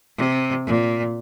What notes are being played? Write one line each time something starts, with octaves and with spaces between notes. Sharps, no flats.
C3
A#2